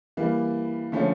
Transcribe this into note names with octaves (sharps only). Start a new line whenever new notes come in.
E3 G3 A#3
D3 F3 A3 C#4